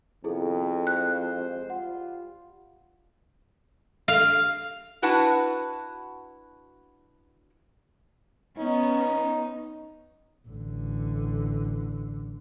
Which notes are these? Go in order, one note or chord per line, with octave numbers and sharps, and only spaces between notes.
F2 C3 D#3 B3 E4 G#4 A4
G3 G#3 C5 F#6
G3 F4 F#5
F5
D4 E4 F#4 B4 F#5 A5
B3 C#4 D#4
A1 D3